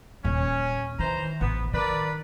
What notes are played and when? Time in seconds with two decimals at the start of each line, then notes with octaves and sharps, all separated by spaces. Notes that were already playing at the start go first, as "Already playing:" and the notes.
0.25 D#1 C#4
0.99 D#3 E3 C5 A#5
1.41 A1 B3
1.73 D#3 A#4 B4 D5